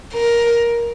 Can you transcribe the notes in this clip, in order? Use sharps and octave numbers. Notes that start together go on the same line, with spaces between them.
A#4